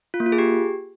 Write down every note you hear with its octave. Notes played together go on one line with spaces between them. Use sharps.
F4
A#3
F4
G#4
G4